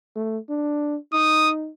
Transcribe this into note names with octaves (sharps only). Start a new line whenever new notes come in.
A3
D4
D#4 D#6